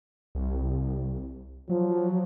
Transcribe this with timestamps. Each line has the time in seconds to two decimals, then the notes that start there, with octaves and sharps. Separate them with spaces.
0.35 C2
1.69 F3 F#3